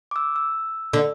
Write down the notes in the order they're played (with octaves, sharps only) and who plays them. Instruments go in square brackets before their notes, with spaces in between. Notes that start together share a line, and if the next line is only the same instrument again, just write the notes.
[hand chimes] D6
E6
E6
[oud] D3